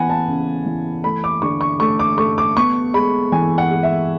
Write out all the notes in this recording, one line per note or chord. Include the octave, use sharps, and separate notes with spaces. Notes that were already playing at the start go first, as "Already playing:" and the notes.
Already playing: E3 B3 F#5 G#5 B5
A5
C#3
E3
A3 B5
D6
D3 C#6
C#6
A3 C#6
D6
A3 C#6
D6
B3 C#6
G#3 B5
E3 G#5
F#5
G#3
E5